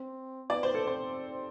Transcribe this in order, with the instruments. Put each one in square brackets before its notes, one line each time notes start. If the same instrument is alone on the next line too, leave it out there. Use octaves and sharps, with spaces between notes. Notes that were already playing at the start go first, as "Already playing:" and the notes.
Already playing: [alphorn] C4
[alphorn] B3 [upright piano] D5
[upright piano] C5
A4
[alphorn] C4 [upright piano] C5